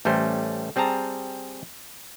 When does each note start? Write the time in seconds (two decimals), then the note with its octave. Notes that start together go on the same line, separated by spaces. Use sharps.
0.05 A1 G3 A3 C#4 C5
0.76 G3 C4 G#4 A5 A#5